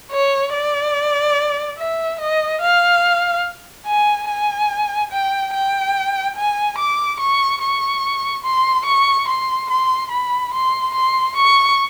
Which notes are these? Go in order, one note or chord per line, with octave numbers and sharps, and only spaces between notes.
C#5
D5
E5
D#5
F5
G#5
G#5
G5
G5
G#5
D6
C#6
C#6
C6
C#6
C6
C6
B5
C6
C6
C#6